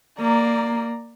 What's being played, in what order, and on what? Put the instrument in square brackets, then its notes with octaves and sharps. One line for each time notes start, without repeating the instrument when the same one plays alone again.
[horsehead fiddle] A#3 [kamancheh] D5 A#5